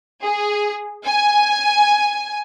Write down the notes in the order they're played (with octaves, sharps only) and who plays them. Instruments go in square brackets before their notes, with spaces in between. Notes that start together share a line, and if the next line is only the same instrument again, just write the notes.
[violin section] G#4
G#5